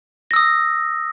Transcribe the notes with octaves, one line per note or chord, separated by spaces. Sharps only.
D#6 E6 A#6